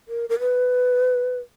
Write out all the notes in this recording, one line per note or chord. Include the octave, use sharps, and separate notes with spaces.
A#4
A#4
B4